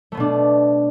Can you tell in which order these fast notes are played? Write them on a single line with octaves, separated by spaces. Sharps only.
A3 B3 B2 D4